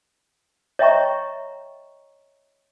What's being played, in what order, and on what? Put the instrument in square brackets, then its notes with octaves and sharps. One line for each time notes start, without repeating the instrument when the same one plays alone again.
[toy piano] C#5 D#5 E5 G5 A#5 C#6